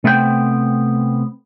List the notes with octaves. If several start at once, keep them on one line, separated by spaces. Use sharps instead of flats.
C3 A3 B3 C4 B4 G5